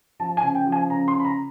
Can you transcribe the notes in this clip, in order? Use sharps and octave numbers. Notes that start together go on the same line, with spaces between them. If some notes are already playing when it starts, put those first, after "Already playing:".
F3 A5
G#5
C#3
G5
F3
G#5
C#3 A#5
C6
C#3
B5
A#5